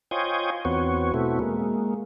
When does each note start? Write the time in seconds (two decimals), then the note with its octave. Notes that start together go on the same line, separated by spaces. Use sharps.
0.11 F4 C5 C#5 D#5 G5 G#5
0.65 E2 B3 C4 F#4 C#5
1.14 B2 A3 C4 E4 F#4
1.39 G#3 A#3